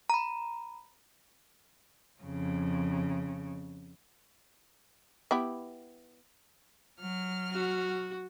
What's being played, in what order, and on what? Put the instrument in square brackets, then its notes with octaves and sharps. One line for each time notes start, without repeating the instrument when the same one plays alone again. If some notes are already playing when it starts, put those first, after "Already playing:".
[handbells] A#5 B5
[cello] F2 C#3
[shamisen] B3 E4 G4
[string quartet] F#3 F6
[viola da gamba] F#4